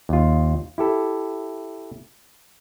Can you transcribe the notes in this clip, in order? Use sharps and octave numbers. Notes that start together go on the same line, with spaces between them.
D#2 F4
E4 G4 A4